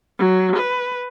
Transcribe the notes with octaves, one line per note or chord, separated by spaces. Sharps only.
F#3
B4